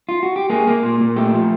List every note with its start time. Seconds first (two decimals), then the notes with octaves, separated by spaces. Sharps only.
0.09 F4
0.23 F#4
0.36 G4
0.50 A#3 G#4
0.67 A#3
0.83 A#2
1.00 A#2
1.16 A3 G4
1.34 F3